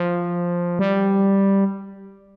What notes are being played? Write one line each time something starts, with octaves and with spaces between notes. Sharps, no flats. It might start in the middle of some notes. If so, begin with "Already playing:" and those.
Already playing: F3
G3